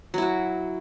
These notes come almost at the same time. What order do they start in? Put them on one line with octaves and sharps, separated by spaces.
F#3 E4 F#4